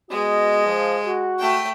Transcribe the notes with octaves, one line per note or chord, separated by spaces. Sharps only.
G#3 B3 F#4 D#5
F3
F#4
A3 G5